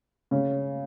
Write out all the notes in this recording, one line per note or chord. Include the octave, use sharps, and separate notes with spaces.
C#3 C#4